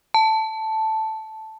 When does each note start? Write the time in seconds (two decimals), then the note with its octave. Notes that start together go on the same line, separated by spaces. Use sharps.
0.14 A5